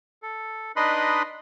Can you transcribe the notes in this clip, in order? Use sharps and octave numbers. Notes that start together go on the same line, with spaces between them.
A4
D4 D#4 B4 D#5 B5 C6